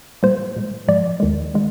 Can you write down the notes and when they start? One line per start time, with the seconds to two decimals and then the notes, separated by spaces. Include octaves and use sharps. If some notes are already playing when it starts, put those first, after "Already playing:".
0.23 A#2 G3 A#3 C5
0.56 A#2 G#3
0.88 G#2 F3 G#3 D5
1.20 D#2 D#3 G#3
1.54 D#3 G#3